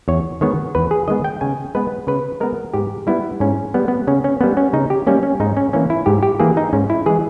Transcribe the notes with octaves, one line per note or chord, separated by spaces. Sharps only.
E2 C#5
D#3 G#3 B3 C#5
E2 B4
G#4
D#3 G#3 B3 D#5
G5
C#3 G#5
G#3 B3 B4
C#3 B4
G#3 B3 A#4
G#2 G4
G3 B3 E4
G#2 C#4
G3 B3
B3
C#3 C#4
C#4
G3 A#3 B3
C#4
C#3 D#4
G4
G3 A#3 C#4
C#4
G#2 D#4
C#4
E3 A#3 C#4
E4
G#2 G4
G4
E3 A#3 G#4
D#4
G#2 C#4
E4
E3 G#3 G#4